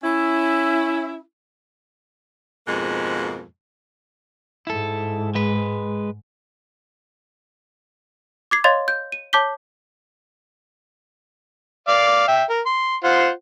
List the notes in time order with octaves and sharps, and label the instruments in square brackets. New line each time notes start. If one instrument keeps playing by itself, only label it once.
[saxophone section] C#4 E4
F2 G#2 B2 F3 G#3 A#3
[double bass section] G#2 [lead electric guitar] E4 A4
[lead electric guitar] G#3 B4
[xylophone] D6 G#6 C7
C#5 D#5 F5 C6 G#6 A6
G6
D#7
C#5 A5 D6 G6 B6 G7
[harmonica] D5 F5
E5 G5
A#4
C6
F4 C5 F#5